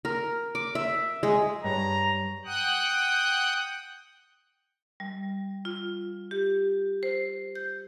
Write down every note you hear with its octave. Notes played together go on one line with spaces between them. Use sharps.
A#4
D6
E5
G#3
G2 B4 C#5 A#5
F#5 G5 D#6 F#6
G3
F4
G4
C5
G6